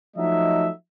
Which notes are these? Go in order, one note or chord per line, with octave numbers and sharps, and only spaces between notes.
F3 F#3 A3 D#4 D#5 E5